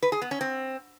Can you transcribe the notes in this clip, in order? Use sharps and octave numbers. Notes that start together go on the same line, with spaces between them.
B4
G#4
B3
C#4
C4